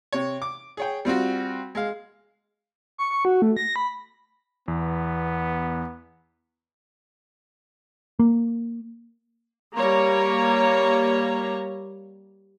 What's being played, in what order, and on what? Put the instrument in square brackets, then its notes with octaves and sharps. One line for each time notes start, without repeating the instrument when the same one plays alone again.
[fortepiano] C3 C#5
D6
G#4 C#5 G5
G3 C4 F4 F#4
G#3 F5
[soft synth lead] C#6
C#6
F#4
A3
A#6
B5
[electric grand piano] E2 [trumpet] B3
[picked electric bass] A#3
[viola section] G3 A#3 C#5 A#5